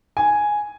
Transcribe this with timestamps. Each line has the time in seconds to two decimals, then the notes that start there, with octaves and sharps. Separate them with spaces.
0.17 G#5